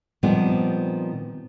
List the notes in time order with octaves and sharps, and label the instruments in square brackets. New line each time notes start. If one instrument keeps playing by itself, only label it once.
[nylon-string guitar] A#2 D#3 F3 G3 B3 C4